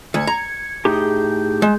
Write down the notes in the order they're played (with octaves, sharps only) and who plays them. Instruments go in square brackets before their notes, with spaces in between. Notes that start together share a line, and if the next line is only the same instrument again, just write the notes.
[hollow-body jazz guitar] D2 [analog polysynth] G#6 C#7
[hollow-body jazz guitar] A#5
[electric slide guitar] A2 D#4 G4 [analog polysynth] G#4 G6
[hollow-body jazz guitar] G#3